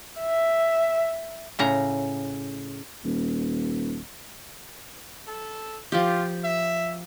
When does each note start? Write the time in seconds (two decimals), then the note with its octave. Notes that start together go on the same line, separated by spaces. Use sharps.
0.21 E5
1.59 A2 C#3 A#5
3.04 D#1
5.27 A4
5.92 F3 F4 G4
6.44 E5